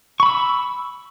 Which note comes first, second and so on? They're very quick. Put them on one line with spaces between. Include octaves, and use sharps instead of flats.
C#6 B5 E6